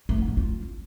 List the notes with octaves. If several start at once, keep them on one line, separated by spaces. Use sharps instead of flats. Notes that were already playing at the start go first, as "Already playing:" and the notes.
A3
D#4
F#3
F4